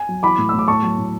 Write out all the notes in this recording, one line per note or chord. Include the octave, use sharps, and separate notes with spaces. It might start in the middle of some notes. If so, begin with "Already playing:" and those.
Already playing: G#5
F#3
E3 B5 D6
A2
A2 E6
D6
A2 A5 C#6
F#3
A2